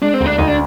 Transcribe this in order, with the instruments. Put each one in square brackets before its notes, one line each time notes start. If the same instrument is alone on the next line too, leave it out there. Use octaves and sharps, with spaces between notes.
[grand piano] G#3 [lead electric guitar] D4
[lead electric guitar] C4
[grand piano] D2
[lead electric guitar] D4
[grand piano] D2 [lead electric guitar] D#4
[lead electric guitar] D4